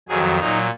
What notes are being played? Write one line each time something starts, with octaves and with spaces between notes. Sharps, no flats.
F2 D#3 F#3 G#4
A#2 F#3 D#4